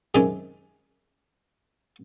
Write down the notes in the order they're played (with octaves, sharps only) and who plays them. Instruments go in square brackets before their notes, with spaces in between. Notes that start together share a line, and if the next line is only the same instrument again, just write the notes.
[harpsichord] F#2 C3 D#3 G#3 D5 G#5